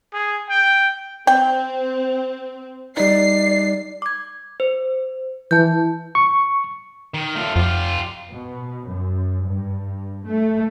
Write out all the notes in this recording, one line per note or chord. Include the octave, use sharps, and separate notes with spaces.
G#4
G5
C4 G5
G3 D#4 D5 C7
D6 G#6
C5
E3 A5 G6
C#6
D#3
A3 F4
F2 F4 G4
B2
F#2
G2
A3